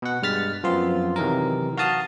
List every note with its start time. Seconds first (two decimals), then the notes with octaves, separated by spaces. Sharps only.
0.02 B2 F#5
0.22 G2 G#3 F6 A6 B6
0.63 F#2 F3 B3 C4 F4 C6
1.16 C3 D#3 E3 F#3 A#4
1.77 F#4 F5 A5 D#6